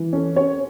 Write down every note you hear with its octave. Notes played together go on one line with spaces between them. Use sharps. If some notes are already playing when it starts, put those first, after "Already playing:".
Already playing: E3
C#4 A4
C#4 C#5